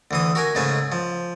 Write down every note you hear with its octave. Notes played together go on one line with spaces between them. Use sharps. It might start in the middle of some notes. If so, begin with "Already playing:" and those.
D2 E3 D#6
F#4 A#4 G#5
G#2 C#3 A3 B4 G#5
F3